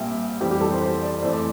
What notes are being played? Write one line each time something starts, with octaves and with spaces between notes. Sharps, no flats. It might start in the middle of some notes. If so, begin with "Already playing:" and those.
Already playing: A#1 A#2 G3 E5 G5
F2 E3 G3 G4
G4
A4
C5
C5
D5
F2 E3 A3 C5
D5